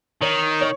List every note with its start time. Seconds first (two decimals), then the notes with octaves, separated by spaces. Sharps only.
0.22 D#3 C#5
0.61 C#5